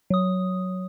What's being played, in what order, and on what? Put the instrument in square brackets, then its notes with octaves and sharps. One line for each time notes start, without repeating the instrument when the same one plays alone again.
[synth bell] F#3 D#6